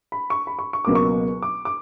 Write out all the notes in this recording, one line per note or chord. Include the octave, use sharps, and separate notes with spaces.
B5
C#6
B5
C#6
C#6
C#2 B2 F#3 A#3 D6
C#6
D6
D6